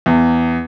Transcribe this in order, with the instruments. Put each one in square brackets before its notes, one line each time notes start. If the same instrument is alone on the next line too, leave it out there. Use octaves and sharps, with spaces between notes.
[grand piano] E2